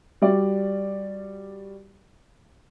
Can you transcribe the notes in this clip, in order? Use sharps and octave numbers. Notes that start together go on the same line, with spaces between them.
G3 F#4 G4 D5